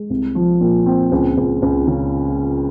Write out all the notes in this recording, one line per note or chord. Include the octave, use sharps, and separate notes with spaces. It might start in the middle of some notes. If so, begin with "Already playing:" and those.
Already playing: G#3
C2
F3
A#2
C4
C#2
C#2
C#2
C#3